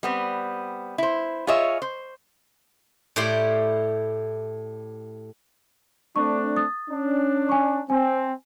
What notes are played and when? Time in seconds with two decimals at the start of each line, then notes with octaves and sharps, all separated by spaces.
0.03 G3 B3 C4
0.98 E4 C5
1.47 F4 G#4 C#5 D#5 E5
1.82 C5
3.16 A2 E4 G4 D5 C6
6.16 A3 C4 D4 C#6
6.56 D#6 A6
6.89 C#4 D4
7.49 G#5 C#6
7.90 C4 G#5